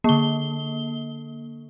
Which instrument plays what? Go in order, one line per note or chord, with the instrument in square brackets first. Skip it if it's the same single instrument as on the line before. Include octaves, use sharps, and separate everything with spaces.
[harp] D3 C#6 [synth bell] A#3 G7